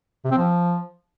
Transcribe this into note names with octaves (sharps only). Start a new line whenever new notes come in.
C3
C4
F3